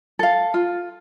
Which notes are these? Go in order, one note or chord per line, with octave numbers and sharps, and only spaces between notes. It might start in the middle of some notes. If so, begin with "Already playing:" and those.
A4 F5
F4